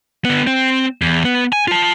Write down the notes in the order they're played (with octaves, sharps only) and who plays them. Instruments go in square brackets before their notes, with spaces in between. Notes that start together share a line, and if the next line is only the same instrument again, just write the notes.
[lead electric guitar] D3 B3
C4
E2
B3
G#5
F4 A5